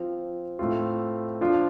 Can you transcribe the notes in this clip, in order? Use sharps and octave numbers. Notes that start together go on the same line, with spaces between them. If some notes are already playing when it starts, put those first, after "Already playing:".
Already playing: F3 C4 F4
A2 A3 C4 F4
F3 D4 F4